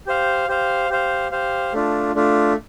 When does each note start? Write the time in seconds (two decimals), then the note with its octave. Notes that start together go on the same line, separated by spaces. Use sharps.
0.07 G4 C5 F5
0.48 G4 C5 F5
0.89 G4 C5 F5
1.32 G4 C5 F5
1.73 A3 D4 F4
2.15 A3 D4 F4